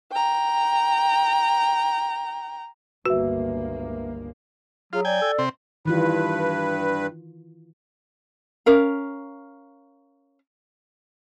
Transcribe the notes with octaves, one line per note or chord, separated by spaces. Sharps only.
G5 A#5
G1 C#2 A#3 F#4 B4 E5
F#3 F4 G#4
D5 G5 G#5
A4
C3 C4
G2 D#3 E3 F4 B4
C#4 A#4 F5